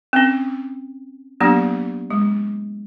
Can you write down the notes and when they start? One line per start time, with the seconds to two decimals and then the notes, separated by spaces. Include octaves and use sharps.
0.13 C4 C#4
1.40 F#3 A#3 B3 D4 G4
2.11 G#3